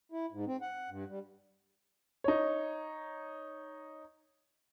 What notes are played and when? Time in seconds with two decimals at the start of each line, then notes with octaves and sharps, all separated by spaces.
0.12 E4
0.32 G#2
0.47 C4
0.62 F#5
0.90 G2
1.09 G3
2.24 D#4 C#5